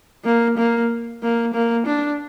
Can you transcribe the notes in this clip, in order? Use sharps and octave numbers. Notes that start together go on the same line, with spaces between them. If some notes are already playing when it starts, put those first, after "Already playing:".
A#3
A#3
A#3
A#3
D4